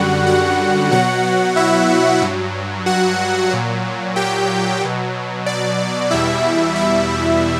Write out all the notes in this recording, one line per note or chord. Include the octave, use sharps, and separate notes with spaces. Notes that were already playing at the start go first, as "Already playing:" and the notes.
Already playing: F#2 D3 G3 F#4 F#5
F#4 F#5
B2 F#3 F#4 F#5
E4 E5
G2 F#3
F#4 F#5
A#2 F#3
G4 G5
B2 F#3
D5
E2 B2 G3 E4 E5
E4 E5